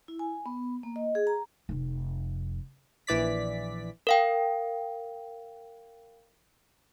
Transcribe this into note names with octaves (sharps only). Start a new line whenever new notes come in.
E4
G#5
B3
A#3
D#5
G#4
A#5
F1 F2
A#1 E3 D5 B6
A#4 F5 G5